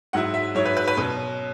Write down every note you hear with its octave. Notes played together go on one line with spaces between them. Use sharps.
G#2 F#3 E4 F#5
E5
G#2 F#3 E4 C#5
B4
B4
B4
B2 F#3 C#4